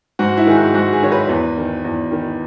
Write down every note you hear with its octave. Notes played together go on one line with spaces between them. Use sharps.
G#2 F#4
E4
D#3 G#4
F#4
G#2 F#4
G#4
D#3 C#5
B4
E2
D#3
E2
D#3